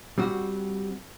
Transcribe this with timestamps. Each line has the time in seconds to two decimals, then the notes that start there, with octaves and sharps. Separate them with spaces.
0.18 G3 C4 F#4